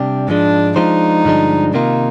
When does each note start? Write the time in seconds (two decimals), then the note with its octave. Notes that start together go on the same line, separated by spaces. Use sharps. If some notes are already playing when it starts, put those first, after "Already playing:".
Already playing: C3 G3 D4 G4
0.28 G#2 F3 G#3 D4
0.76 F3 G#3 D4 D#4 F4 C5
1.25 G2 D3 F3 G#3 D4
1.74 C3 D#3 A#3 D#4 F4